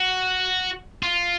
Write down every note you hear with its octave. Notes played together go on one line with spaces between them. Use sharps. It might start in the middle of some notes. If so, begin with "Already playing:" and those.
Already playing: F#4
F4